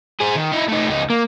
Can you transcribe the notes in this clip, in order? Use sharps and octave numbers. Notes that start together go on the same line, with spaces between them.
G#4 C5
D#3
D#4 E4
A3 D#4
C#2 D#4
A#3